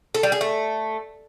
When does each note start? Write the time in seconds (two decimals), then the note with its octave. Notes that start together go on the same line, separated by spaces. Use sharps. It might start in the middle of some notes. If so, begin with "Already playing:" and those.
0.14 A4
0.23 G3
0.32 G#4
0.41 A3